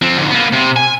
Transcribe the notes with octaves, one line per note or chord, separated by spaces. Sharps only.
F3 C4
D2 G#2
A#3 B3
C3
G#5